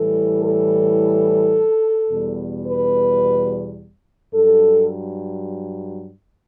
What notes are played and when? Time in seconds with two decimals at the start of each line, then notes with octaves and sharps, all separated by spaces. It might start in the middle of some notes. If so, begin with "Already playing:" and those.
Already playing: A2 E3 G3 A4
0.43 A4
2.11 E2 B2 G3
2.67 B4
4.33 G2 F#3 A4